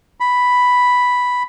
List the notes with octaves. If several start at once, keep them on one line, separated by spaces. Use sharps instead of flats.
B5